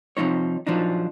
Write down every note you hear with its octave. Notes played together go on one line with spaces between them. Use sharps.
C3 E3 F3 D#4 C#5
A#2 F3 F#3 D4 D#4